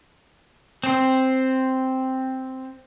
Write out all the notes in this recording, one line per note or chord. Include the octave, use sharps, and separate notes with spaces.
C4 C5